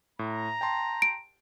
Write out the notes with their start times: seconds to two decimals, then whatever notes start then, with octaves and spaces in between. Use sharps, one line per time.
0.19 A2 A#5
0.61 G5 A5 C6
1.02 D7